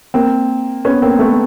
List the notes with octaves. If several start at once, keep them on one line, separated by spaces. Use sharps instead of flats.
A#3 C4
B3 C#4
A#3 C4
A3 B3